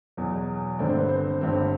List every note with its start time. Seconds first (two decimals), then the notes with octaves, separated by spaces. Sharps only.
0.17 E2 B2 F#3
0.79 G1 G2 D3 A3 C4 D5
0.89 C5
0.99 B4
1.09 C5
1.41 G1 G2 D3 A3 C4